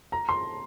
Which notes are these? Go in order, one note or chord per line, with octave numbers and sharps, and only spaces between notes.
A#5
C6